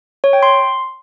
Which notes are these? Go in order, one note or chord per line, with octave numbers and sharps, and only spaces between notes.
C#5
G5
C6